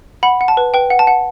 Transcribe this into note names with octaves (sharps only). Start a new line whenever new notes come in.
F#5 B5
F#5
A5
B4
B4 G5
F#5
A5
F#5